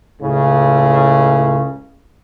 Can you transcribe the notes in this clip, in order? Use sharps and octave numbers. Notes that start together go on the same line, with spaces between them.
C#2 A2 C#3